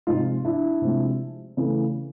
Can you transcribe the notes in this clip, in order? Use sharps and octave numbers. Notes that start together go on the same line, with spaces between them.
C3 F3 G#3 D#4 F4
D4 E4
C3 F3 G#3
C#3 E3 A3